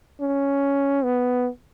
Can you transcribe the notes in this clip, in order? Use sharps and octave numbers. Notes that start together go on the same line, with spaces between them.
C#4
B3